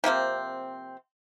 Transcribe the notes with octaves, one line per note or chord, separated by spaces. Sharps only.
C3 F3 A#3 C4